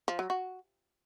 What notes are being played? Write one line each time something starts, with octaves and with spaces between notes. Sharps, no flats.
F3
F#3
F#4